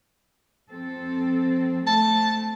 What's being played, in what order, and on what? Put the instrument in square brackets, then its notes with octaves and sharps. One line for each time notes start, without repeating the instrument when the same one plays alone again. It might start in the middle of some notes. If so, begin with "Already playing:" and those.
[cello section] F3 C4 A4
[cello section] A3 C4 [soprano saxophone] A5